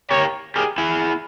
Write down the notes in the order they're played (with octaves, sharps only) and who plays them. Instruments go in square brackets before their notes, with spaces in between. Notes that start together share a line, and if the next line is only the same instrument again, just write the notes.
[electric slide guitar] G4 A#4 [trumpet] C#5
[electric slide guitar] G4 A#4 [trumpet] G#4
[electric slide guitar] E4 G#4